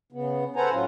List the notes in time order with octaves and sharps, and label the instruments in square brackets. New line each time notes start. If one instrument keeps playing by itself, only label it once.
[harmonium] C#3 B3
A4 B4 C5 F#5 G#5 A#5
A2 F#3 C#4 F4